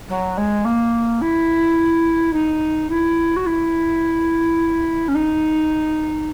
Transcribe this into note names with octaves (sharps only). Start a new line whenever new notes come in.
F#3
G#3
A#3
E4
D#4
E4
F#4
E4
C#4
D#4